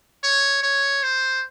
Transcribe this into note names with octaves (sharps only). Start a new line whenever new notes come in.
C#5
C#5
C5